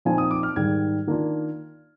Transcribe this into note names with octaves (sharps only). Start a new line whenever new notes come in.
A#2 F3 C4 D#4 G#5
D#6
D6
F6
G#2 D#3 G3 G#6
D#3 A#3 D4 F4